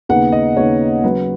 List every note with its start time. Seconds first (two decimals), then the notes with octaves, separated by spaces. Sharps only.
0.09 D#2 C#3 B3 D#4 F#5
0.32 D#5
0.56 D#2 C#3 B3 D#4 C#5
1.03 C#3 F#3 C#4 B4